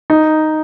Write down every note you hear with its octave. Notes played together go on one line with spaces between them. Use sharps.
D#4